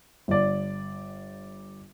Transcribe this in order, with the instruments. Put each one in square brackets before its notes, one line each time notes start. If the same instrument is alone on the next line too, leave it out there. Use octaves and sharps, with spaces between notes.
[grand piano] G1 D5